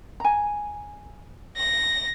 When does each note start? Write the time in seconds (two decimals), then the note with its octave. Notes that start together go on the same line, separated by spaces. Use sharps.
0.20 G#5 A#5
1.56 A#6